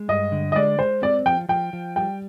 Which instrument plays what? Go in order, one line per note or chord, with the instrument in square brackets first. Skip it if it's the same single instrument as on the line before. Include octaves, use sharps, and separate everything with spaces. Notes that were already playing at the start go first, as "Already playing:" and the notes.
Already playing: [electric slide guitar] G#3
[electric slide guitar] G2 [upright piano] D#5
[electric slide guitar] D3
[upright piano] D#5
[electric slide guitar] G#3 [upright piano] D5
[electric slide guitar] G#3 [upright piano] C5
[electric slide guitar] C4 [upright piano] D5
[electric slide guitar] F3 [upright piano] G5
[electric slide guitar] F3 [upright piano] G5
[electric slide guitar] F3
[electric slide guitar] G3 [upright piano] G5